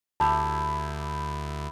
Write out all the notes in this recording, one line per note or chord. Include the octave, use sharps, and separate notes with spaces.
D2 E4 G4 A5